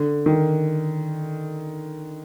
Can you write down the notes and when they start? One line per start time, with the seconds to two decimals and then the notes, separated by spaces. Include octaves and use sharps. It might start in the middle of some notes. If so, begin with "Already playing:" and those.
Already playing: D3
0.26 D#3